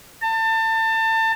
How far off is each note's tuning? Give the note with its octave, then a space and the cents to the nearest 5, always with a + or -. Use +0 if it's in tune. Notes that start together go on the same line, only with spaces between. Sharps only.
A5 +30